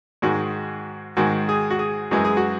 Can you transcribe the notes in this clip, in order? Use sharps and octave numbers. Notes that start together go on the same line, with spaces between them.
G#2 D#3 G#3 F#4
G#2 D#3 G#3 F#4
G#4
F#4
G#4
F#2 E3 G#3 F#4
G#4
F#4